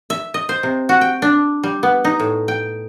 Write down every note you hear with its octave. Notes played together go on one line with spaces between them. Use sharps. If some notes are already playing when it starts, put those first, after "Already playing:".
E5
D#5
C5
C3
F#4
G5
D4
G3
B3
D#4
A2
G5